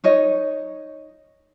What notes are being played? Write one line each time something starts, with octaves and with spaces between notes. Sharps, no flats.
D#4 C#5 D#5